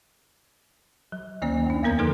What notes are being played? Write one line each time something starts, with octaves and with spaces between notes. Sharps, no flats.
F#3
D2 D#3 A#3 C#4 D5
F#2 D4
E2 A#3 B3 A#4 A#5 G#6
D3 F3 D#4 A4 B4